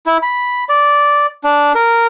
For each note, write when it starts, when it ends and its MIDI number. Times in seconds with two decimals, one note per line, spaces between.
0.06 0.17 64
0.23 0.64 83
0.69 1.26 74
1.44 1.73 62
1.75 2.07 70